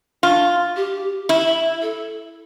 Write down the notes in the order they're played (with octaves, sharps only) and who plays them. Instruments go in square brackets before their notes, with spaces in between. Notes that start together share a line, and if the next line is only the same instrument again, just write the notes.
[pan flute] D4 [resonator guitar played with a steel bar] F4
[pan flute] G4
[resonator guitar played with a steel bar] E4
[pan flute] A4